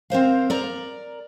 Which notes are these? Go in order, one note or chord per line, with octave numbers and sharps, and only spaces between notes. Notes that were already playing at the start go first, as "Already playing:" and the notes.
C4 A#4 C5 F5
A#4 D5 A#5